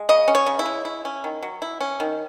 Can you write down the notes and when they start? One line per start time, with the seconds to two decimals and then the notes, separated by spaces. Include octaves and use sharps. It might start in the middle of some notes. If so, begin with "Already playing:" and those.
Already playing: G#3
0.09 C#3 D#5
0.28 C#4
0.35 C#5
0.46 C#3
0.59 E4
0.66 G#3
0.85 E4
1.05 C#4
1.24 D#3
1.43 F#3
1.62 E4
1.80 C#4
2.00 D#3